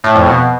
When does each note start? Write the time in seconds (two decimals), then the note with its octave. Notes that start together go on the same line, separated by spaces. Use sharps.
0.04 A2
0.15 F2
0.26 B2